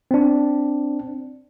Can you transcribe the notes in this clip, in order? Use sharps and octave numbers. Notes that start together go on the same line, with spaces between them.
C4 D4